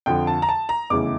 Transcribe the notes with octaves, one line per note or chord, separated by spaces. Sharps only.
F2 D3 F3 G5
A5
A#5
A5
A#5
F1 E2 C#3 E3 D6